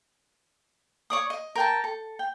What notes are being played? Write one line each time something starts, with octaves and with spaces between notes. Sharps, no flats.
C#5 D5 D#6
D#5
A#4 G5 A5
A4
G5